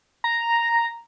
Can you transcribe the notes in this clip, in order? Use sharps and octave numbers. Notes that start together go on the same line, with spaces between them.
A#5